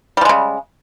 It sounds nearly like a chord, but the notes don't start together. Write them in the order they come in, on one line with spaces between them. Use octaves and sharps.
G3 F3 G#3 C#3